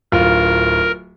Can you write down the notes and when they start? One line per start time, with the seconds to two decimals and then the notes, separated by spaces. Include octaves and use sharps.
0.12 D1 F4 A#4